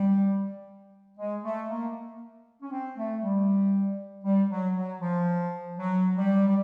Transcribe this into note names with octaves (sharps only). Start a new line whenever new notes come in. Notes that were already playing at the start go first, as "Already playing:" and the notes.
Already playing: G3
G#3
A3
A#3
C#4
C4
A3
G3
G3
F#3
F#3
F3
F#3
G3
G3